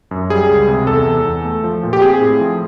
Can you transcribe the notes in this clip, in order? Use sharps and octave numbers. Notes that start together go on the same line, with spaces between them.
F#2
G3 G#4
C#2
C3
E2 A4
E2
E2
A3
F3
A#2
G4
C4 G#4
A2
F3